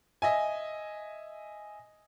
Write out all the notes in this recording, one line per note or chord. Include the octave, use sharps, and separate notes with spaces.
D#5 E5 G#5